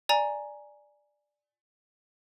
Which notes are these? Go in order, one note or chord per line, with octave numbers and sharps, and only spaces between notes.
D5 G#5 A#5